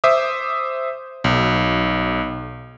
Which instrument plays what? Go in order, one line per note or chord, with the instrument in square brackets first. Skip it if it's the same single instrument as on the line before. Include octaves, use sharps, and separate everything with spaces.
[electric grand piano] C5 E5 D6 D#6
B1